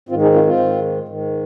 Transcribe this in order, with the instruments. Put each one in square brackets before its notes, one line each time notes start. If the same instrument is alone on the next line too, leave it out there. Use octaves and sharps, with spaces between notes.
[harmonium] G#2 D#3 C4 F4
D#4 G#4
C4 F4
C4 F4
G#2 D#3
G#2 D#3